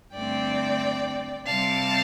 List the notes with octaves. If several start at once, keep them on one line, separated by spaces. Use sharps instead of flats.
G2 D3 A3 C4 D5 G5
C3 G3 C4 F5 A5